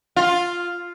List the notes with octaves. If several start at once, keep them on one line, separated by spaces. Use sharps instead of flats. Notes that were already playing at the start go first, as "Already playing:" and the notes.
F4